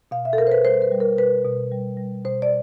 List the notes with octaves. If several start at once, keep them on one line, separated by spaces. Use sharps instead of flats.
B2 F5
E5
A4
B2 A#4
C5
B4
G3 C5
B4
G3
A#4
B2 B4
B2
G3
G3
B2 C5
D5